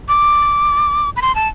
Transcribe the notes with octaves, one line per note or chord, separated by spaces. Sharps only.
D6
B5
C6
A5